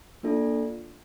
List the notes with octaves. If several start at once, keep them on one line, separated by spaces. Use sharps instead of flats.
A#3 D4 F4 A4